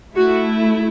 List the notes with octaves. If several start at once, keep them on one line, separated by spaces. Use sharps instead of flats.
A3 E4 F#4